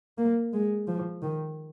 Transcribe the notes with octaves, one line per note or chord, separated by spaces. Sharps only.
A#3
G#3
F3
D#3